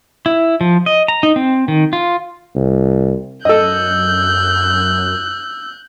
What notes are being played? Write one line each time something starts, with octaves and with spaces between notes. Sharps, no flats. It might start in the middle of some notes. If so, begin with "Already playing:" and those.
E4
F3
D#5
A#5
D#4
C4
D#3
F4
C2
F#2 A4 D#5 E6 F#6 G6